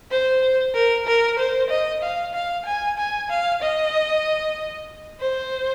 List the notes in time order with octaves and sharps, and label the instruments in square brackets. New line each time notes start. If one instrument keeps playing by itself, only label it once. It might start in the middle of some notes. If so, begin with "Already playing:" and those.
[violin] C5
A#4
A#4
C5
D#5
F5
F5
G#5
G#5
F5
D#5
C5